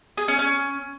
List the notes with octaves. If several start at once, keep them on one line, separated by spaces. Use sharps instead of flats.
G#4
C#4
C#4